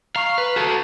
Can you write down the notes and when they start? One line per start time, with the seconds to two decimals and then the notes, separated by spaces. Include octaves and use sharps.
0.16 F5 A#5 C#6 F7
0.38 B4
0.56 F#4 A4